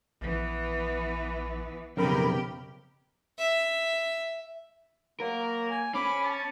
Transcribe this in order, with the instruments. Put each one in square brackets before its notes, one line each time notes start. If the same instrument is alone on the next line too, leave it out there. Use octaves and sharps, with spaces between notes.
[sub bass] A#1 [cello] E3 B3
[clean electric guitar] B1 F2 [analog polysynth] C#3 A#4 B5 [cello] G4 G5
[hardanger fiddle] E5
[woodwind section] F#3 A#3 [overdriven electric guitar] A#4
[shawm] G#5
[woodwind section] F2 B5 [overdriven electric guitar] C#4 [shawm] D6
[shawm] A5